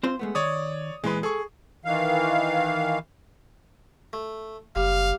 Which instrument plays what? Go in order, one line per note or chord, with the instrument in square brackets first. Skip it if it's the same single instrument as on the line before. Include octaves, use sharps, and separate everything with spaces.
[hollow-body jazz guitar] C4 F4 C5
G#3 A3 B3
[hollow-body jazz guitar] D#3 [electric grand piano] C#5 D5 D#6
[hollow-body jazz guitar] A#2 E3 C6 [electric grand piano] G#3 B4
[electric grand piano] G#4 C#6 [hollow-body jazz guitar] A4
[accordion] D#3 E3 F5
[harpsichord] A3
[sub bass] F#1 [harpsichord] G3 [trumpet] F5